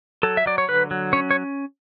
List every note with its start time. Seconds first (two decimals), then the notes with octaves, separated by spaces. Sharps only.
0.23 F#3 A4
0.37 E5
0.46 F#3 D5
0.58 C#5
0.68 D3 B4
0.91 F#3
1.13 C#4 C#5
1.31 C#5